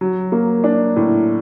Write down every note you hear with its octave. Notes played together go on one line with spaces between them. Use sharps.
F#3
A#3
D4
A2